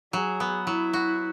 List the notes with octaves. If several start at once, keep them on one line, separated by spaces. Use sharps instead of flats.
F#3 G#4
B3
F#3 E4
F#4